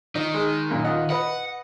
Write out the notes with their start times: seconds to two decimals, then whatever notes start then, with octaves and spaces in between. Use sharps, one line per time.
0.15 D#3 D#4
0.34 G#3
0.71 F#2 A#2
0.84 F4 D#5 F#5
1.10 B4 D#5 F#5